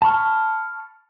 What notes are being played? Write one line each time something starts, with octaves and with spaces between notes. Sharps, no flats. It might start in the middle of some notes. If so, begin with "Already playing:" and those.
A5 B5 C#6 F6